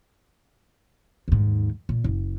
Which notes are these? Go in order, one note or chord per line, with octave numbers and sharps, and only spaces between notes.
D#2 G#2
A#2
F#1